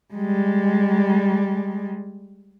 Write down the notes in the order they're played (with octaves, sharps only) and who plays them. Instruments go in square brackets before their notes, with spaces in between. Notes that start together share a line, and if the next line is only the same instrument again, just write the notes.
[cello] G3 G#3